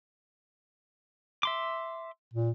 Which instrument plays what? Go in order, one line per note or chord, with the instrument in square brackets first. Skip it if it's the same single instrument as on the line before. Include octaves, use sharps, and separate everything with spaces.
[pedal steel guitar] E5 C6 D6
[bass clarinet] A#2